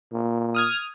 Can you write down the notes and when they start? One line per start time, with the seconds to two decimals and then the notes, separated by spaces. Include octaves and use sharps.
0.13 A#2
0.55 D#6 F6 G#6